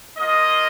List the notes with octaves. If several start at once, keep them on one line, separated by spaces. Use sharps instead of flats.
A#3 F4 D#5